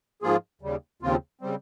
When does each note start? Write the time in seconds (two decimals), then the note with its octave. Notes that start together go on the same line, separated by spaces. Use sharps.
0.22 G#2 F3 A#3 F4 G#4
0.62 D#2 C#3 G3
1.02 D#2 C#3 F3 C4 F4
1.41 C#3 G3 C4